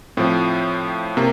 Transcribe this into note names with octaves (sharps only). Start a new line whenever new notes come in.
A2 F3 C4
C3 A#3